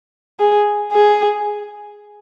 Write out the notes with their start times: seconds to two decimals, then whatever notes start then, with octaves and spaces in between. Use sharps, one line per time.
0.40 G#4
0.93 G#4